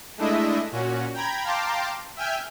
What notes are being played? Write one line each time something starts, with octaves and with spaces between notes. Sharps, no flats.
G#3 A3 D4 E4 D#5 E5
A#2 C#4 F#4
G5 A#5 B5 G#6
F5 G5 A5 A#5 C6 D6
E5 G5 G#5 F6 G6